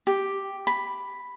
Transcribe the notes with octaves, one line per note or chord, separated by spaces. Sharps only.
G4
B5